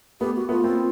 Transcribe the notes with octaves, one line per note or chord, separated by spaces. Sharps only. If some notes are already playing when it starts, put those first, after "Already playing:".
A3 B3 G4
F#4
A3 B3 F4
A#3 C4